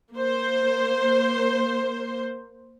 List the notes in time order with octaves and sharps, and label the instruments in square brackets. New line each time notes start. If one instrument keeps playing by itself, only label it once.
[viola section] A#3 C5